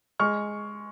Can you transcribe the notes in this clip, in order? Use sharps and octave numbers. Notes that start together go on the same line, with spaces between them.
G#3 C#6 F6